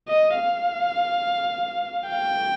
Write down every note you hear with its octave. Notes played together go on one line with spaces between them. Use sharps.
D#5
F5
G5